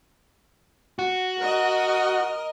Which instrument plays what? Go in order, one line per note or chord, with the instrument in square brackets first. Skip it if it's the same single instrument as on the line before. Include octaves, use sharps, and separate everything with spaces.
[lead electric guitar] F#4
[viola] A#4 D#5